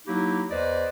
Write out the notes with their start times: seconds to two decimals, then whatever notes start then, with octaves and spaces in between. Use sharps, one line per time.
0.07 F#3 A#3 D#4 E4 G4
0.50 E2 B4 C5 D5 D#5